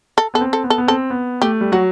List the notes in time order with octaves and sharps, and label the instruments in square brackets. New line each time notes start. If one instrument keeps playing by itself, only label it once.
[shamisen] A4
[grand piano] B3 [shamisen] A4
[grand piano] C4
[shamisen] A4
[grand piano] B3
[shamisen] A4
[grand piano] B3
[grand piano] C4 [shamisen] A4
[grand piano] B3
[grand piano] A3 [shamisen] G4
[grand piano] G3
[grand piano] F#3 [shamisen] F#4